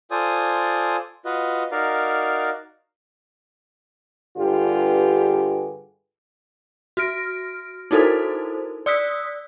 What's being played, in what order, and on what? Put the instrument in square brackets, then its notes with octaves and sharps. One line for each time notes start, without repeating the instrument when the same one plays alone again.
[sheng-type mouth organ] F4 A4 C5 D5 G#5 D#6
F4 F#4 B4 D#5
D#4 F#4 A#4 D5 F5
[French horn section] G2 D3 F4 G4 G#4 B4
[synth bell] F#4 F6 A#6 D7
D#4 E4 F#4 A4 A#4 C5
D5 D#6 E6 F#6 B6